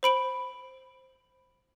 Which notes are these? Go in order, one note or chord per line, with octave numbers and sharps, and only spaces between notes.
C5 B5 D7 F#7